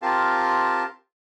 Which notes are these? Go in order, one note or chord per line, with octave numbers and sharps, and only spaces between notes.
C4 F4 G4 A#4 F5 A5